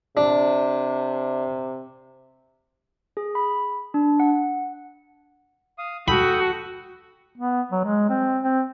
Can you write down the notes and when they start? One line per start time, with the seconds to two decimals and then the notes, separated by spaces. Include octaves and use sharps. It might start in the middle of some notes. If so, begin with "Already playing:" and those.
0.17 C3 D4
3.17 G#4
3.35 B5
3.94 D4
4.20 F#5
5.78 F5 D#6
6.08 F#4 A4 G5 B5 D#6
7.38 B3
7.72 F#3
7.85 G#3
8.10 C4
8.44 C4